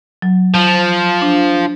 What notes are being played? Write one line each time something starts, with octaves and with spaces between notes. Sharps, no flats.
F#3
F3
D4